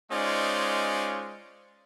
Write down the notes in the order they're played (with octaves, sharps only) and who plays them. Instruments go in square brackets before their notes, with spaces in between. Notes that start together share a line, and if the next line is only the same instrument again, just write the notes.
[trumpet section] G#3 C#4 D#4 F4 C5 D5